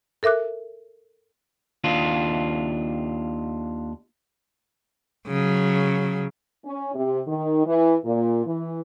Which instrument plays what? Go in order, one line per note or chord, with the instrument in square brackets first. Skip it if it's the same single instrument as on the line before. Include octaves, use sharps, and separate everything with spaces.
[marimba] A4 A#4 E5 D6 F#6
[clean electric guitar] D#2 D4 F4
[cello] C#3 F#3
[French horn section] C#4
C3
D#3
E3
A#2
E3